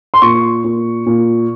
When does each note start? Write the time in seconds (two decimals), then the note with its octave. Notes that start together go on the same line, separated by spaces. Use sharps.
0.14 C6
0.22 A#2 C#6
0.64 A#2
1.06 A#2